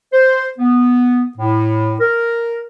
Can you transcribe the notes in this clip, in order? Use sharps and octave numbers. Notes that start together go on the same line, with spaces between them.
C5
B3
A2
A#4